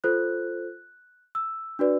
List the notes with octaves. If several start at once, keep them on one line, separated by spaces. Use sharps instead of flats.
F4 A4 C5 F#6
E6
D4 F#4 B4 D5